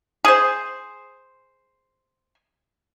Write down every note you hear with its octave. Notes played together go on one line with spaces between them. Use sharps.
G#4 C5